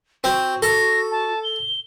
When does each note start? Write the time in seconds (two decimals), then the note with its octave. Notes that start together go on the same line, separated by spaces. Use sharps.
0.24 C4 F#4
0.62 A4 A#6
1.11 A5
1.43 G7